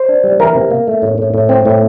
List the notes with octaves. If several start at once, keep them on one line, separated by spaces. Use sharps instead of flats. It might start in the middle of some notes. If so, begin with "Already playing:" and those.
Already playing: C5
D4
G3
E3 A#4
C3
A#3
A3
A2
A2
A2
C4
A2